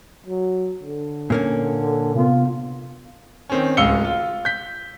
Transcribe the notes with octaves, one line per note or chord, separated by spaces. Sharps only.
F#3
D3
A#2 A#3 C#4
C3 B3 F4
D#3 C4 C#4
D1 C#2 F5 E6 C#7 G7
F4
G6 B6